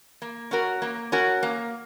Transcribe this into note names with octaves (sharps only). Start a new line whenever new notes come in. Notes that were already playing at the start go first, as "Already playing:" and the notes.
A#3
C#4 F#4 A#4
A#3
C#4 F#4 A#4
A#3